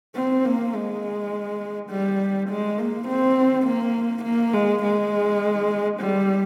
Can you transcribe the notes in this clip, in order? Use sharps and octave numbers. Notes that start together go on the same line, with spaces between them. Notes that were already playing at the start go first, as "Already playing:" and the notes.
C4
A#3
G#3
G3
G#3
A#3
C4
A#3
A#3
G#3
G#3
G3